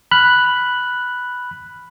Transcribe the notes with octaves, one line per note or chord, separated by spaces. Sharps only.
B5 F6 F#6